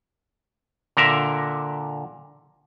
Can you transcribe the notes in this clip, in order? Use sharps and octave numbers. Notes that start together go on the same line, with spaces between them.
A#2 D3 A#4 E5